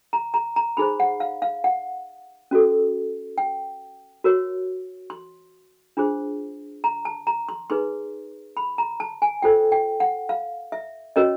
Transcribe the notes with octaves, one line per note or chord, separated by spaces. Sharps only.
A#5
A#5
A#5
D#4 G#4 C5 B5
F#5
F5
F5
F#5
C#4 F#4 A4
G5
F#4 A#4 C#5
C6
D4 F4 G#4 C5
A#5
A5
A#5
C6
D#4 G#4 B4 C6
B5
A#5
A5
G#5
F4 A4 C5 G5
G5
F#5
F5
E5
C#4 F#4 A#4 C#5 D#5